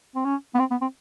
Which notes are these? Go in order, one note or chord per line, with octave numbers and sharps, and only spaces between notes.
C4
C#4
B3
C4
B3
C4